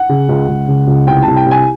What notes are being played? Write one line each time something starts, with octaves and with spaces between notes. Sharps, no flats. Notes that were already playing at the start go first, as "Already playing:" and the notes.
Already playing: F#5
C#3
C#2
C#2
C#3
C#2
C2 G5
C2 A5
G5
C2
G#5